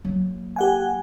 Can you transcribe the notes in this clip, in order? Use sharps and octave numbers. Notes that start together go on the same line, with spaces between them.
F#3 A#3
G4 F#5 G#5